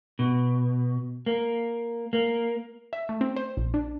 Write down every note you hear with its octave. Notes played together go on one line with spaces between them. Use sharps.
B2
A#3
A#3
E5
A3
C4
C5
A#1
D4